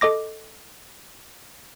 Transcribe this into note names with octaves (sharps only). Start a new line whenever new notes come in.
A4 D#5 D6 A#6